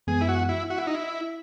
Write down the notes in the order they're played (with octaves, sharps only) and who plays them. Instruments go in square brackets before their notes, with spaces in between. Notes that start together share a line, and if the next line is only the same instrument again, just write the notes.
[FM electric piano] F#2 E3 G#3 B3 [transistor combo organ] G#4
[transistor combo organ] E4
F#4
E4
F#4
E4
D#4
E4